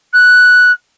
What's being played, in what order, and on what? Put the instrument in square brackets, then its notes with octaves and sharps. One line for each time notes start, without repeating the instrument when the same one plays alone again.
[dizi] F#6